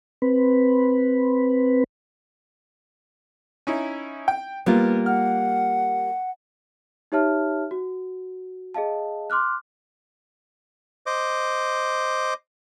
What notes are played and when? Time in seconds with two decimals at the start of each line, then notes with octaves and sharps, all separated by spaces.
0.22 C4 B4
3.67 C#4 D#4 E4
4.28 G5
4.66 G3 A#3 B3 F4
5.06 F#5 F6
7.12 D#4 G4 C#5 E5 A5 F6
7.71 F#4
8.74 G#4 D#5 F5 A5
9.30 C6 D6 F6 F#6
11.06 C5 D#5 D6